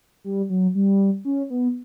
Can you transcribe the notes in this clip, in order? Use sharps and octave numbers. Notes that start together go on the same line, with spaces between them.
G3
F#3
G3
C#4
B3